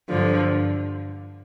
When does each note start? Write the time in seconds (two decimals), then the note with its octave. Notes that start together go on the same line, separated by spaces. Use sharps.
0.11 G2 D3 F3